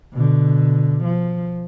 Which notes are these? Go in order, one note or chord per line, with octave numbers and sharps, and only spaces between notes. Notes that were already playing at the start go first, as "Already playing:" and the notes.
B2 D3
F3